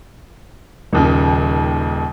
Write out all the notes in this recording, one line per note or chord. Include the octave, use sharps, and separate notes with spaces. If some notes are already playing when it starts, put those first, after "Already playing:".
D#1 D#2 C#3